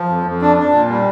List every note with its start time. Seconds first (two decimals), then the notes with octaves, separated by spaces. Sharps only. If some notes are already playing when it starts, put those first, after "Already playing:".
Already playing: F3
0.09 F2
0.25 F2
0.41 D4
0.57 D4
0.74 A#2
0.89 G3